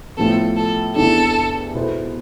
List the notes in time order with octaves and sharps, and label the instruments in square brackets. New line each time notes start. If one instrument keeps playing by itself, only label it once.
[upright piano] A2 F3 B3 [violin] A4
[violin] A4
[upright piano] E2 C3 E3 B3 D4 [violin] A4
[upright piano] B2 B3 E4 A4 C5